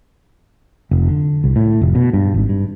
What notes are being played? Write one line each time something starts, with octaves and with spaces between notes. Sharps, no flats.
F1
D3
C2
A2
F1
B2
G2
G#1
G2